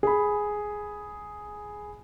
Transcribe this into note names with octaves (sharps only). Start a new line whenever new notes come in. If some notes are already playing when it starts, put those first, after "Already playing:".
G#4 B5